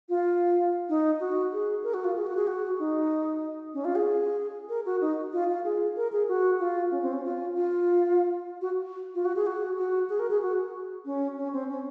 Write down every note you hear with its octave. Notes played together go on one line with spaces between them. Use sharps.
F4
D#4
F#4
G#4
A#4
F#4
F4
G#4
F#4
G#4
F#4
D#4
C#4
F4
G#4
A#4
F#4
D#4
F4
F4
G#4
A#4
G#4
F#4
F4
C#4
C4
C#4
F4
F4
F#4
F4
F#4
G#4
F#4
F#4
G#4
A#4
G#4
F#4
C#4
C#4
C4
C#4